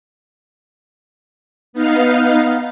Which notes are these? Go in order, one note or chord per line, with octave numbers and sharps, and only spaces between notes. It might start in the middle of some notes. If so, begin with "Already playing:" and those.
B3 D#4 F5